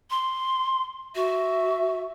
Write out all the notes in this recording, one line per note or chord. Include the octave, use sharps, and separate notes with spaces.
C6
F#4 E5